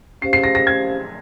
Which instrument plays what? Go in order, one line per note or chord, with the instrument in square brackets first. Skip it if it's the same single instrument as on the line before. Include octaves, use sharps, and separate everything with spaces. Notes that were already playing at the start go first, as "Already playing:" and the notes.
[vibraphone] C#4 G4 C5 F5 [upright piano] C7
[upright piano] C7
A#6
A#6
G#6